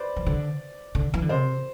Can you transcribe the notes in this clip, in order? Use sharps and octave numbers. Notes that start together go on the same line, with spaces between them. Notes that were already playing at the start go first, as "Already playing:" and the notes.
Already playing: B4 C5 D5
E3
D3
D3
E3
D3
C3 C5